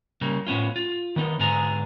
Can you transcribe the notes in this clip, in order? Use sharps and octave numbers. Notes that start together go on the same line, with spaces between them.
C#3 G3 A#3
A2 B3 C#4 F4
F4
D#3 B3 D#4
G#2 D3 B3 G#4 A#5